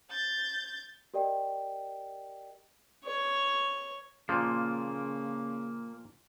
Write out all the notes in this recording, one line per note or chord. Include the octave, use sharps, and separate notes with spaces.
G6 A6
G4 A#4 D5 D#5 G5
C#5
A#2 C#3 F3 A#3